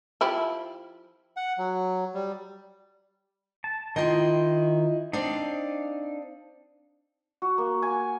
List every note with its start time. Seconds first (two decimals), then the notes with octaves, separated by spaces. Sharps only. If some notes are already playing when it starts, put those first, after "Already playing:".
0.21 F3 E4 G4
1.37 F#5
1.58 F#3
2.14 G3
3.64 A5
3.96 D#3 E4 F4 D#5 G5 C6
5.13 C4 D4 D#4 D5 F5
7.42 F#4
7.58 A#3
7.82 G#5